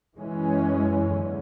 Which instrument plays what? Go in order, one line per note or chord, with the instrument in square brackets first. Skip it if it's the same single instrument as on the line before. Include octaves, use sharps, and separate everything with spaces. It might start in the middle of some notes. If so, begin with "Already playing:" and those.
[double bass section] F#2 E3 G#3 C#4
E2 D3